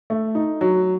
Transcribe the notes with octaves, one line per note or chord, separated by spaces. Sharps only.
A3
D#4
F#3